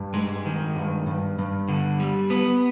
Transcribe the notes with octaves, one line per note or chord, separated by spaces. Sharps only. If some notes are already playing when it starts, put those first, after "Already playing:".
Already playing: G2
G#3
D#3
G2
G2
G2
D3
G3
B3